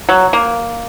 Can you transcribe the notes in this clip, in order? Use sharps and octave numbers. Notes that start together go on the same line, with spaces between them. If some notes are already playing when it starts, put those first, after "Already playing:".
F#3
A#3